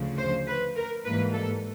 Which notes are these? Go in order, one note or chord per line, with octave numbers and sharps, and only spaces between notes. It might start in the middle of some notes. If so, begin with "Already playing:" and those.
Already playing: D2 C#3 F3
C5
B4
A#4
G#2 E3 G3 A#3 B4
A4